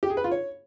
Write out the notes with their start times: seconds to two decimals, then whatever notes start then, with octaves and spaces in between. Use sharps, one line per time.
0.03 G4
0.10 G#4
0.17 B4
0.24 F4
0.31 C#5